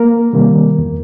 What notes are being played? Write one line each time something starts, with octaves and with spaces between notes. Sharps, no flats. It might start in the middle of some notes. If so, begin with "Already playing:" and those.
Already playing: A#3 A#4
C3 D#3 G3 A#3
E2